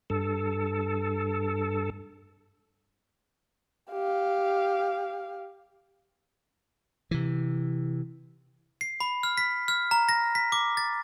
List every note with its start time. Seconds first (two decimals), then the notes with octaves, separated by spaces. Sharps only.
0.10 G2 A4
3.91 G4 F5
7.11 C3 E3
8.81 C7
9.00 B5
9.23 F6
9.37 B6
9.68 F6
9.91 A#5
10.09 A#6
10.35 B6
10.52 D6
10.77 A6